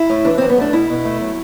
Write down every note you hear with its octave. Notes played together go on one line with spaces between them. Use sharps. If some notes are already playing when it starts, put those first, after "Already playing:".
Already playing: E4
A2
E3 D4
F#2 C4
B3
A3 D4
B2 E4
B2
A3
F#3